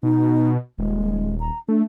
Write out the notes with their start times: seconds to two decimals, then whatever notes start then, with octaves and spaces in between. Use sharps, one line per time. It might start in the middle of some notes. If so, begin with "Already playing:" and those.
0.03 B2 D#4
0.79 D#1 G#3
1.40 A#5
1.69 A3 D4